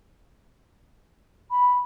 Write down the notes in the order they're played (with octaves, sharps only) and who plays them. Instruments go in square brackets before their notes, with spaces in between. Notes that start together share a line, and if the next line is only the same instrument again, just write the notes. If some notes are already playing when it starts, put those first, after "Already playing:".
[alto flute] B5